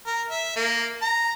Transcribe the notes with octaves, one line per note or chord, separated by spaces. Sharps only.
A#4
E5
A#3
A#5